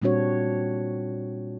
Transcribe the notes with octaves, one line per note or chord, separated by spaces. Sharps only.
A#2 G3 C4 D4 F#4 C#5